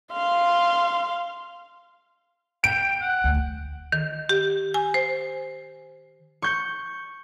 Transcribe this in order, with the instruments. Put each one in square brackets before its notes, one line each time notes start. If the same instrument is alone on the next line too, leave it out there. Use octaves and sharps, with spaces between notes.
[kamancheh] F5 C6
[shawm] G5 [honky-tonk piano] D7
[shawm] F#5
[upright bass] D2
[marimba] D#3
G4
G#5
C5
[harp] C#6 G6 C#7